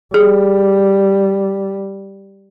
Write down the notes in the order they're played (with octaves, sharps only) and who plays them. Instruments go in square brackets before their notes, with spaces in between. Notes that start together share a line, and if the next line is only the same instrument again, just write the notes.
[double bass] G3 [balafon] G#4